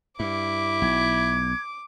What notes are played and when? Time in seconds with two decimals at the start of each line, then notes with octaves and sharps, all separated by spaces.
0.20 G2 E4 D6
0.82 B1 G#6